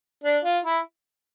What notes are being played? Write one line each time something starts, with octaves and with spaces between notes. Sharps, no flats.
D4
F4
E4